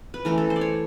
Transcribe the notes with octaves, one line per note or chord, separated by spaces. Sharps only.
B4
E3 A3 C#4 A#4
A4
C5
D5
C#5